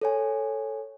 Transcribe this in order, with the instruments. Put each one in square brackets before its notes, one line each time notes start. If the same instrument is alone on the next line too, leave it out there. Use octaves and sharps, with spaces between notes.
[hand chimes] A4 C#5 G#5